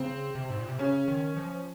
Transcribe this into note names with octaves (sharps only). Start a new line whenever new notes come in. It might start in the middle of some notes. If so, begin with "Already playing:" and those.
Already playing: C#3 C4
C3
G#2
A#2
C3
C#3 C#4
D#3
F3